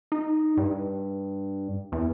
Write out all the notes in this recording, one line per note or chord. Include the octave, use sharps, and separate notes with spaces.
D#4
G2
E2